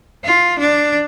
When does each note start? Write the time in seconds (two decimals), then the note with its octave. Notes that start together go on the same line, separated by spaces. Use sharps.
0.24 F4
0.59 D4